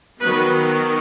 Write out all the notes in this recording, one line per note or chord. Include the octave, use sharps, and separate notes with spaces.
D#3 F#3 B3 B4